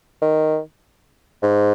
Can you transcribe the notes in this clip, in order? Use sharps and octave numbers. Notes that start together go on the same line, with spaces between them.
D#3
G#2